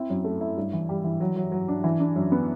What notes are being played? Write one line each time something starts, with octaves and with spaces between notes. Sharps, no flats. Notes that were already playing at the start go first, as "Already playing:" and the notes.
Already playing: C4 E4
F#2
A3
E4
G2
E3
G3
E3
F#3
F#3
F#3
D4
E3
D4
F#2
B3